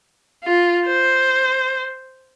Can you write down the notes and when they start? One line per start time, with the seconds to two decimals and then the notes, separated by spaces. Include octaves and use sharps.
0.44 F4
0.87 C5